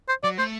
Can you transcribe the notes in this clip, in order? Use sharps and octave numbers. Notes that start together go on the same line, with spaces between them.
C5
F#3 D5
A3 C5